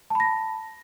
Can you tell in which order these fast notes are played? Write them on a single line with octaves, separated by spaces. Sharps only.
A5 B5 A#6